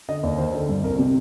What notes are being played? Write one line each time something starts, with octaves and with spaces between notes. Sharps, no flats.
D3 D#5
D#2 D5
D#3 C5
D3 A4
G2
C2 A#4
C3